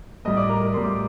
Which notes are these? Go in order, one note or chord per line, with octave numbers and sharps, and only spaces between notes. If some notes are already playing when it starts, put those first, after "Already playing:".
A2 G3 D#5 D#6
D5 D6
A#4 A#5
A#4 A#5
A2 G3 C6
D6